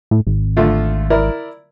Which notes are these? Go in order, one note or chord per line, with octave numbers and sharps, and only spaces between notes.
A2
G#1
D3 A3 F4
E4 A#4 D5